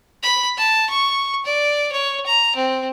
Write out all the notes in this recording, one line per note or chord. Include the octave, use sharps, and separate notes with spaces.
B5
A5
C#6
D5
C#5
A#5
C4